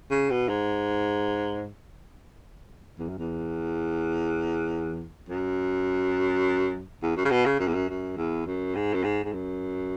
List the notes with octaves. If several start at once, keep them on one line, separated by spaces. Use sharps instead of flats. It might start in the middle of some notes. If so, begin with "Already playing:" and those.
C#3
B2
G#2
E2
F#2
E2
F#2
E2
F#2
C#3
B2
C#3
F#2
E2
F#2
F#2
E2
F#2
G#2
F#2
G#2
G#2
F#2